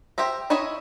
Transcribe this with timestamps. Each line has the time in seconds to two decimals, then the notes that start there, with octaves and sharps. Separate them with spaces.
0.18 G4 C5 E5 A#5
0.50 D#4 E4 C#5 D#5 E5